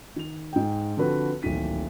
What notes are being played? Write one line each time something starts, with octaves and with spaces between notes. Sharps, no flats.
D#3 F7
G#2 G5
D3 F3 C4 F#4 A4 B4
D1 A#1 D#3 B6 D#7